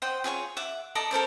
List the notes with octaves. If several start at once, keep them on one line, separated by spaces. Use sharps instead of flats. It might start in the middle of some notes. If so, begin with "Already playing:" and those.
C5 D#5 F#5 G5
F4 G#4 C#5 C#6
E5 F#5 D6
A4 D5 D#5 A#5
A4 A#4 C5 D5